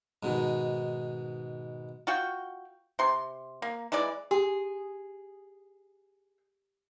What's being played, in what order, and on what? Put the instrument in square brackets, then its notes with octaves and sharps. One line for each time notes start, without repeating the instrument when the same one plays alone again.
[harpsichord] G#2 B2 D#3
[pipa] F4 F#4 G5
C3 C6
A#3
E3 G#3 E4 D5
[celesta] G4 [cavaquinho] G#4